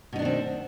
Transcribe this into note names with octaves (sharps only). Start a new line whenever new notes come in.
B2 D#3 C4 D4 D#4